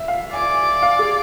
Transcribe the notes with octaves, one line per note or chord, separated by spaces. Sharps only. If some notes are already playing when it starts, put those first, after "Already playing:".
Already playing: E5
F5
D5 G#5
F5
G#4